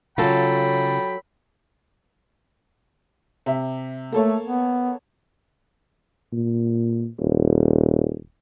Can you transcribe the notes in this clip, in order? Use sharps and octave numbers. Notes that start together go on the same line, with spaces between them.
C#3 F#3 F4 A4 G5 B5
C3 E5
A3 A#3 A4 C#5
B3
A#2
D#1